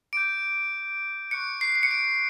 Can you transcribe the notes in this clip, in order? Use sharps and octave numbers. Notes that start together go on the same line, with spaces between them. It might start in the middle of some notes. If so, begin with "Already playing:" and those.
D6 G6 D7
C#6 F#6 C#7
C7
C7
C#7
D7